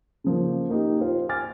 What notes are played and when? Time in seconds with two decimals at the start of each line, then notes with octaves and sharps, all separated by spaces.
0.24 C#3 F3 A#3
0.69 A#3 D#4 G4
1.01 F4 C5
1.29 G#5 D6 F6 A6